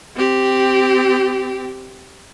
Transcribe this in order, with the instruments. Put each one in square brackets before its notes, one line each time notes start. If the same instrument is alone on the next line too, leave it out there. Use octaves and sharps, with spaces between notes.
[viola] C4 G4